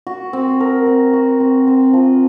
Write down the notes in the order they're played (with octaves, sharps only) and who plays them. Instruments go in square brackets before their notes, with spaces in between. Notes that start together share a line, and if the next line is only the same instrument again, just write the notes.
[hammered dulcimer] F#4
C4
A#4
C4
F#4
C4
C4
F3